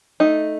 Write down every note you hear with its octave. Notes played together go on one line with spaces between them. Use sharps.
A3 D#4